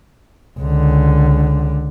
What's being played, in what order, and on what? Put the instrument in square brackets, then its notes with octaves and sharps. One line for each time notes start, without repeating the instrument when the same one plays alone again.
[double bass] C#2 D3